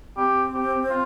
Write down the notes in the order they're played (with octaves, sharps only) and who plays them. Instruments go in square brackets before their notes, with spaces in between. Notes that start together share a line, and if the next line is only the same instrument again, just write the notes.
[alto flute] C4 [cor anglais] G4
[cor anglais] G4
F4